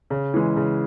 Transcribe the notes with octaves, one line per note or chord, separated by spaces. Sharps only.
C#3
E3 G#3
C#3